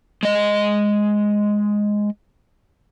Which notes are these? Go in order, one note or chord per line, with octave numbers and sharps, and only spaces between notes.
G#3 D#5